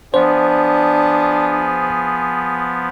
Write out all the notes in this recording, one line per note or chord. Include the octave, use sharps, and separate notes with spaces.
F3 B3 D4 G#4 C5